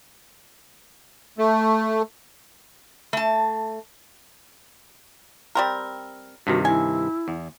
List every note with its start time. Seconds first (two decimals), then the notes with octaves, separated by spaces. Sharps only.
1.38 A3
3.13 A3 A5
5.55 G3 C4 A#4
6.47 G2 C3 D#3 F#4
6.65 E4 G#5
7.28 E2